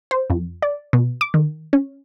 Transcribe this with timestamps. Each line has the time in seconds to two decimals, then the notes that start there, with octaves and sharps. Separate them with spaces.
0.11 C5
0.30 F2
0.62 D5
0.93 B2
1.21 D6
1.34 D#3
1.73 C#4